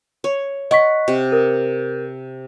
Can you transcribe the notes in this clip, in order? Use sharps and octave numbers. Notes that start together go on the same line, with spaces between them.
C#5
D#5 F#5 C#6 B6
C3
A#4